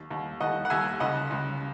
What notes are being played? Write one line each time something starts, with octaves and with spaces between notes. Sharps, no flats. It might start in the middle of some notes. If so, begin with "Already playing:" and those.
Already playing: D#2
D#2
D#2 D#5 F#5
F#5
D#2 E5 G#5
C#2 D#5 F#5
C#2